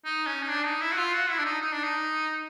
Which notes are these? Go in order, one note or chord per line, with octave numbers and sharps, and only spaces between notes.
D#4
C#4
D#4
D4
D#4
E4
F#4
F4
F#4
E4
D4
D#4
D#4
D4
D#4